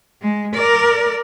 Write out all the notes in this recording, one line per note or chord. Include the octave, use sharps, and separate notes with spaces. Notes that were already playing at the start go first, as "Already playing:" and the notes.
G#3
A#4 D5